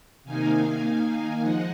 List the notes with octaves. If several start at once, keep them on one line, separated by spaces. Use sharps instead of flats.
C3 D#3 A#3 D#4 F5 G#5
D#3 A#3 D#4 F5 G#5
F3 G#3 D#4 D#5 F#5